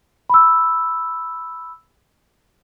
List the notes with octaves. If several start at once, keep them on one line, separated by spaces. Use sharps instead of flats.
B5 E6